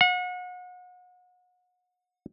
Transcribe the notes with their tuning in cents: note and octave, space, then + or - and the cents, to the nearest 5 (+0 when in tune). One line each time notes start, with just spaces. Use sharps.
F#5 -35